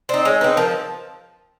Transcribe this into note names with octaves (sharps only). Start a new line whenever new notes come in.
C4 D#4 D5
G#3 C#5
C4 D#4 B4
F3 A#4